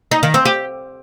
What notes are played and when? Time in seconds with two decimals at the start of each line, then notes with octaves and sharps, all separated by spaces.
0.11 D#4
0.23 D#3
0.34 C4
0.45 G4